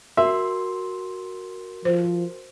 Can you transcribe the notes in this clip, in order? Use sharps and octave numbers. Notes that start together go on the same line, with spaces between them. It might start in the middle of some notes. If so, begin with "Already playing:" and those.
F#4 A#4 E5 C6
F3 C5